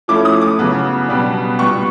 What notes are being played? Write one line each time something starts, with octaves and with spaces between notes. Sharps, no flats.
F3 A3 C#4 E4 D6
D#6
D6
C#3 F#3 B3
B2 G3 B3 D4
A#2 G3 B3 C#6